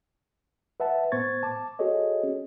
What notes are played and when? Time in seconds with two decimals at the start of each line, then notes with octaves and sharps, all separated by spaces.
0.80 B4 E5 F#5 A5
1.12 A2 B3 C5 C#6 G#6 A6
1.43 A5 D6
1.79 F#4 G#4 A4 C#5 D#5
2.23 C#4